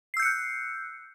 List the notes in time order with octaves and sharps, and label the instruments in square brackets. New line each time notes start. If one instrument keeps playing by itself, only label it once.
[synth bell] C7
E6
G6
C#7
F#6